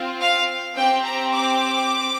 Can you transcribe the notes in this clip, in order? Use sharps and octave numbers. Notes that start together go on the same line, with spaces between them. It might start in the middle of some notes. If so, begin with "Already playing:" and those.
Already playing: C4 F4
F5
C4 G4 G5
A#5
D6